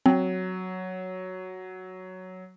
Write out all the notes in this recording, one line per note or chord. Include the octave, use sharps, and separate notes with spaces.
F#3 C4